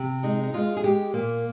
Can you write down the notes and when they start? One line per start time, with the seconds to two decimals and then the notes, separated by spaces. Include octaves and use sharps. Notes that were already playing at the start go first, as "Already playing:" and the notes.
Already playing: C3
0.23 G#3 D#4
0.43 D#4
0.54 G#3 F4
0.77 G#4
0.84 G#3 G4
1.14 A#2 A#3